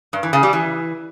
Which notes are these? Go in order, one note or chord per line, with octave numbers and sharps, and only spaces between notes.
G2
E3
C#3
G3
E3